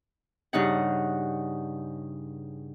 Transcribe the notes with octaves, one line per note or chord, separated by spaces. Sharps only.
G2 C#3 D#4 F#5